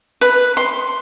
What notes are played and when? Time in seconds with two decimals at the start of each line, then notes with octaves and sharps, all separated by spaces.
0.21 B4
0.57 C6